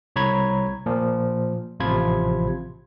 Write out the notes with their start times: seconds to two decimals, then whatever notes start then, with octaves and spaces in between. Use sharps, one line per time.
0.16 C2 C#5 A#5 B5 G#6
0.86 A#2 F3
1.80 A1 C3 F3 F4 B5 G#6